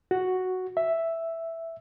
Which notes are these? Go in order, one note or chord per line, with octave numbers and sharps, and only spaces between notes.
F#4
E5